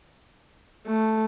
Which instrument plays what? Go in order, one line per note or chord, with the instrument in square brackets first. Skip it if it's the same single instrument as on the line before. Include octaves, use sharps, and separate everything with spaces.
[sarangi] A3